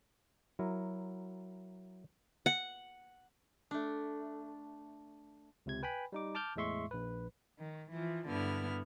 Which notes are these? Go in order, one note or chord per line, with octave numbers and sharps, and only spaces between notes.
F#3 E4 A#4
F#5
A3 D4
C#2 C3 G#6
B4 G5 G#5 B5
G3 D#4 D6
A5 D6 F6 G6
E2 A2 G#3 E5 C6 C#6
A#1 B4
D#3
E3 F3
G2 D3 B3 E4 F6